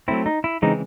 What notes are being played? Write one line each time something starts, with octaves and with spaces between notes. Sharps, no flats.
F#3 A3 C4 E4
D#4
E4
C#3 E3 G#3 C4 D#4